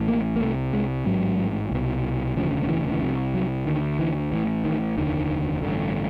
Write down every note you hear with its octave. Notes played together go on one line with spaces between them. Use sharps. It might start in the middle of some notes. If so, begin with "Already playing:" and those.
Already playing: A1 A2
A#3
A#3
C2 C3 A3
G#3
A1 G#2 F#3
C2 B2
E1 D2 C#3 F3
E3
E3
C2 C3 F3
F#3
D2 D3 D#3
E3
A1 A2 E3
D#3
F1 D#2 D3 D#3
A1 G2 D3